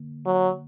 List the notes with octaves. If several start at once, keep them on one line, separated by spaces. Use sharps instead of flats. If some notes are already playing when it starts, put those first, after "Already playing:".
Already playing: D3 A#3
F#3